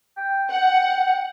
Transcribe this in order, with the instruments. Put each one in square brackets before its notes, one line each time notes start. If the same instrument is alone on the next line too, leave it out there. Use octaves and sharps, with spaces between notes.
[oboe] G5
[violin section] F#5 [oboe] G5